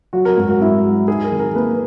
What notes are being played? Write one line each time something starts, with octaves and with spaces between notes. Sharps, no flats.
F#3 F#4
A#4
G#2 F#4
F#4
G#2 E4
F#3
D#4 G#4
A#4
D#3
A#4
A#3 B4